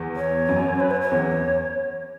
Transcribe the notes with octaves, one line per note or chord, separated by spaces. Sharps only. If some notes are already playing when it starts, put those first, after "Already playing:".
Already playing: E2
C#5
F#2
B4
C#5
C#5
E2